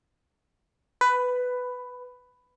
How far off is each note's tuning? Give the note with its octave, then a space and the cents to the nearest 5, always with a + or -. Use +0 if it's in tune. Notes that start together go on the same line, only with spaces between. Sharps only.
B4 +10